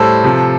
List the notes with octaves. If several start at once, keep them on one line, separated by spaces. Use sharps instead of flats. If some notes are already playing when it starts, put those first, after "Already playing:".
Already playing: A2 G3 A4 C5
C3 F3